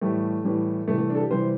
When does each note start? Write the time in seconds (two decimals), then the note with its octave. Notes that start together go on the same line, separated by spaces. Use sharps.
0.01 A2 E3 G3 A3
0.45 A2 E3 G3
0.88 C3 E3 G3 A3
0.98 A3
1.10 D4
1.15 A4
1.20 G4
1.30 C3 E3 G3 C5